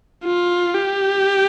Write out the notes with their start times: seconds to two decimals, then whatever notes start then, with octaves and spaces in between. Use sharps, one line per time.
0.25 F4
0.74 G4